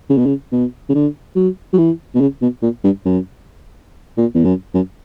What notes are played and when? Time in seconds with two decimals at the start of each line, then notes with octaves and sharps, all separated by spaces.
0.09 C#3
0.18 B2
0.26 C#3
0.52 B2
0.89 C#3
0.94 D3
1.36 F#3
1.73 F#3
1.78 E3
2.15 B2
2.21 C#3
2.42 B2
2.62 A#2
2.84 G2
3.06 F#2
4.17 A#2
4.35 E2
4.45 F#2
4.74 F#2